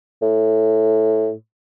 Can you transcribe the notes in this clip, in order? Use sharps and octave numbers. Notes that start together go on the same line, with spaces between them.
A2